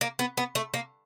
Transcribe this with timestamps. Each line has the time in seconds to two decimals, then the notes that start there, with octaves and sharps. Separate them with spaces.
0.01 A#3
0.19 B3
0.37 B3
0.55 A3
0.74 A#3